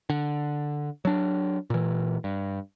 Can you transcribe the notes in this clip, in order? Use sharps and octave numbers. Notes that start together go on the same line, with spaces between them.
D3
F#3 D4
A#2 E3
G2